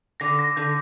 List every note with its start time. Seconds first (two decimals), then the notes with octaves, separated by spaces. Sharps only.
0.20 D3 A#6
0.39 A#6
0.56 D3 G6